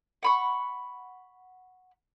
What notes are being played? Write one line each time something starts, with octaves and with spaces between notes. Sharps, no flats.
F#5 B5 C#6